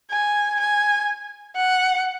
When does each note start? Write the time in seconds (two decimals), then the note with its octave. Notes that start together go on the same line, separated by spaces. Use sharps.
0.11 G#5
0.60 G#5
1.56 F#5